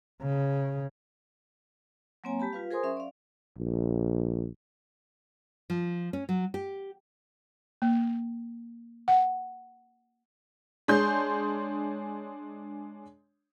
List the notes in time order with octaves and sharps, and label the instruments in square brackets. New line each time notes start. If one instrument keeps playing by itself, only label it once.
[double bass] C#3
[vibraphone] F#3 A#3 C4 C#5 G#5 A#5
G3 G4 A5 B5
F4 B4 F5
G#4 A#4 C5 G#5 C6 D#6
F#3 C#4 E5 C6
D5 F5
[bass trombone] A#1
[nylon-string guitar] F3
C#4
F#3
G4
[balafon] A#3
F#5
[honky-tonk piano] G#3 D4 G#4 C#5 C6 G6